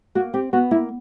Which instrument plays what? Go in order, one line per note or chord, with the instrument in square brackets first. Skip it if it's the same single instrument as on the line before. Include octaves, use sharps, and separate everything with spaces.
[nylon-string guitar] A#3 [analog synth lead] F#4
[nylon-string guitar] C4 [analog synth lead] G4
[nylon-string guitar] B3 [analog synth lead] F#4
[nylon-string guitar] A#3 [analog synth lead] E4